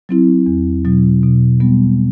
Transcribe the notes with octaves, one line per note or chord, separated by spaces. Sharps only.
F#3 C4 E4
E2
B2 F#3
B2
G3 B3